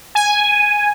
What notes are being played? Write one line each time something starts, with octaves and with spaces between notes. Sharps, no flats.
G#5